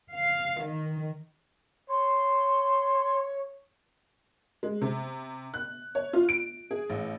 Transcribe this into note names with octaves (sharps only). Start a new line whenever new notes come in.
F5
D#3
C#5 C6
G#3
C3
F#6
C#5
F4
D7
G#4
A1